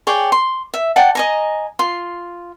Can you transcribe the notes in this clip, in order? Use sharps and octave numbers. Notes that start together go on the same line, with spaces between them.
G#4 C#5 D5 G5
C6
E5
D5 F#5 G5 A5
D#5 G#5 A#5
F4 C6